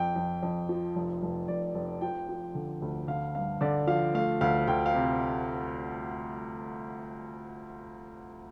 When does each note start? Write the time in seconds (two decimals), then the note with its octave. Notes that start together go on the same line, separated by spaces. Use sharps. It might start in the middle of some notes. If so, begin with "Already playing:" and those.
Already playing: F2 G5
0.16 F2
0.43 F2
0.69 F3
0.96 F1
1.23 F1
1.48 F1 D5
1.75 F1
2.01 F3 G5
2.29 F3
2.55 D3
2.82 D2
3.07 D3 F5
3.35 G2 F5
3.61 D3 D5
3.87 F3 F5
4.14 A3 F5
4.41 D2 F5
4.67 D2 G5
4.86 F5
4.94 C3